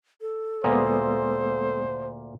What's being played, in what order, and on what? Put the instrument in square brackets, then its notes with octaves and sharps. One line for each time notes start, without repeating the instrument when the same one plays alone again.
[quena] A4
[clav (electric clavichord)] D2 A#2 A#3 [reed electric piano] G#3 B3 D#6 [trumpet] C5